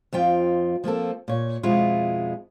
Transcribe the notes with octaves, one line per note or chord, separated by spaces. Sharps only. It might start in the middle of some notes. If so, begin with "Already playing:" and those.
F2 F3 F4 G5
F3 A#3 C4 A4
A#2 C#5
F2 B2 G#3 E4 F4